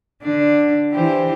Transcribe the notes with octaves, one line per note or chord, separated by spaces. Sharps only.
D3 D4
E3 G4 C5